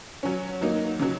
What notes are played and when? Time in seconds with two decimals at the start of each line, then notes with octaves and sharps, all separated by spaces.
0.23 F#3 C#4
0.61 F#3 A#3 D#4
1.00 C#3 F#3